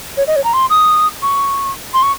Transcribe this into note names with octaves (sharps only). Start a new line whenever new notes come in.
C#5
D#5
C#5
A#5
C6
D#6
C#6
C6
C#6